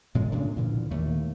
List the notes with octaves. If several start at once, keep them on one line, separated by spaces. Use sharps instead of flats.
A2 C3 F3 G#3
A2 C#3 D4
A#2 D3 E3 F3
D#2 A3 A#3